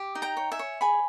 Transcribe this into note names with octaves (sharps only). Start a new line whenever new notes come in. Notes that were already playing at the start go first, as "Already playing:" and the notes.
Already playing: G4
D#4
G5 A#5
C#5
E5 G#5
C#5
G#4 G#5 B5